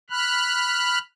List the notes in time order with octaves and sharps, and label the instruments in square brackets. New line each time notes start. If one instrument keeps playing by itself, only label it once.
[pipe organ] B5 F6 F#6